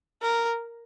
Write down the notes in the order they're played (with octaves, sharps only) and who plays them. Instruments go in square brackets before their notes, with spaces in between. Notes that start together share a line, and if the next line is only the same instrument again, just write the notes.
[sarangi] A#4